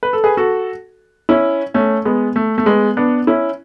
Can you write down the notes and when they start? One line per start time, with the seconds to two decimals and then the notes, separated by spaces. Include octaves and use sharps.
0.03 B4
0.13 A4
0.24 G#4 B4
0.37 F#4 A4
1.29 C#4 E4
1.74 A3 C#4
2.05 G#3 B3
2.36 A3
2.58 A3
2.66 G#3 B3
2.97 B3 D4
3.27 C#4 E4